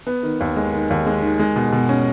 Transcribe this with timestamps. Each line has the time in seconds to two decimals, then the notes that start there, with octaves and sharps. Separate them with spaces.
0.07 B3
0.23 D#3
0.41 D#2
0.57 G#3
0.73 D#3
0.90 D#2
1.06 G#3
1.22 D#3
1.40 G#3
1.56 B2
1.72 B2
1.89 C#4